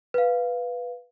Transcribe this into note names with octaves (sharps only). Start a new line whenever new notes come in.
B4 F5